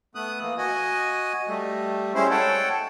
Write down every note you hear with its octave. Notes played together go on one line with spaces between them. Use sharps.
A3 B3 D#6 F#6
E3 A#3
F#4 D#5 G#5
G3 A3
G3 G#3 C#4 E4 C5
A4 C#5 F#5 G5 A5